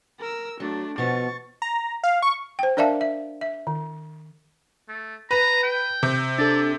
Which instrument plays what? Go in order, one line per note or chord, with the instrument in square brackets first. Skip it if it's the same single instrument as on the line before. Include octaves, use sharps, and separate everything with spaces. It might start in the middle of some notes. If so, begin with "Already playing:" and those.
[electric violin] A#4 E6
[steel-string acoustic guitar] F#3 [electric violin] A3 D4
[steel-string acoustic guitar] B2 F3 B3 [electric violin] C#6 A6
[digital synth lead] A#5
F5
C#6
[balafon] C5 G5
D4 A#4 D5 E5 F5 A5
E5
E5
D#3
[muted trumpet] A3
[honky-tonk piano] B4 [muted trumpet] A#5
[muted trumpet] G5
[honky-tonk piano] C3
[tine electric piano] D4 A4 [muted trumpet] D5